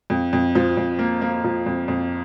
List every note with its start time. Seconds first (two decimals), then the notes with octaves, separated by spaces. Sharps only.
0.10 F2
0.33 F2
0.55 F3
0.77 F2
0.99 A#3
1.21 A#3
1.44 F3
1.66 F2
1.88 F2